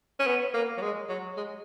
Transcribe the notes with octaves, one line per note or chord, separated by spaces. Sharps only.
C#4
B3
A#3
F#3
G#3
F#3
G#3